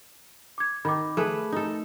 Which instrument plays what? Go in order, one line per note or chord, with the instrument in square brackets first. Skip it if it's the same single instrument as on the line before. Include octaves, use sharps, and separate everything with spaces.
[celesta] D6 G#6
[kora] D#3 [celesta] B5 D6
[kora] A3 G#4 B4
D#4 A4